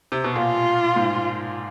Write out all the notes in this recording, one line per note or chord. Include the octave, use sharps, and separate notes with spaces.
C3
B2
A#2 F4
G#2